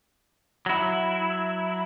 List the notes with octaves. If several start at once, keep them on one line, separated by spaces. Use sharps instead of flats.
F#3 E4